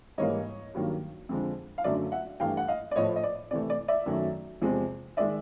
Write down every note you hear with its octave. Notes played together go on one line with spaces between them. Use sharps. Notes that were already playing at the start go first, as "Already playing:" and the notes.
G#2 E3 G3 A#3 C#5 D#5
G2 D#3 F#3 A#3
F2 D3 F3 G#3
F5
F#2 D3 F#3 A3 D5 E5
E5 F#5
G2 E3 A3 F5 G5
F#5
D#5 F5
D5
A2 F3 A3 C#5 D#5
D#5
D5
C3 E3 A3 D5
D5
D5 E5
F#2 D#3 F#3 A3
E2 C3 F3 G#3
D#3 G#3 D5 E5